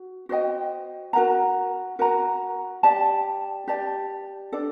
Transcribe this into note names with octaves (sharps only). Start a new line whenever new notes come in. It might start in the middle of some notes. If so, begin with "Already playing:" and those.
Already playing: F#4
F#4 C5 D#5 G5
F#4 A#4 F#5 A#5
F#4 A#4 F#5 A#5
G4 D5 A5
G4 D5 A5
D4 A4 D5